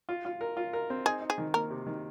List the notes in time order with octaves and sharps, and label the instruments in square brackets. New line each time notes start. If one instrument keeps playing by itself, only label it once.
[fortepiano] F4
F4
A#4
F4
A#4
C4
[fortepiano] D#4 [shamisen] G#4
[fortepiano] D#4
[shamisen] G#4
[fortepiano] D#3
[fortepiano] A#3 [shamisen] A#4
[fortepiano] C3
D#3